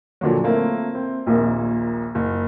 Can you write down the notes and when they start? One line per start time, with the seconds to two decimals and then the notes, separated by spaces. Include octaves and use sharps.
0.21 A#2 D3 F3 F#3
0.43 A3 A#3 C4 E4
0.95 C4
1.26 A#1 D#2 A#2 A#3
2.15 F#1